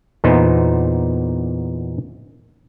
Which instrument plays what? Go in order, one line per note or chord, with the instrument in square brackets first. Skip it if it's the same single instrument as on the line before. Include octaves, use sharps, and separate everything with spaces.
[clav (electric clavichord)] E2 A#2 B3 D#4 C5